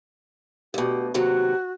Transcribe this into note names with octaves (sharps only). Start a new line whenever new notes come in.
D2 B2 G4
D#2 C3 F#3 F#4